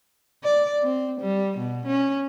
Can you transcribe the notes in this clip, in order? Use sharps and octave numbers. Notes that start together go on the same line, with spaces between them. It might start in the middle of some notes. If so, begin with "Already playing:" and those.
D5
C4
G3
B2
C#4